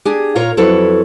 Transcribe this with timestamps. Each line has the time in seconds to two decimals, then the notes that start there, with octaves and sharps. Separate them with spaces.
0.05 D4 G4 G#4
0.35 A#2 A#3 F4 A#4 C#5 A#5
0.57 F2 F#3 E4 A4 B4 C#5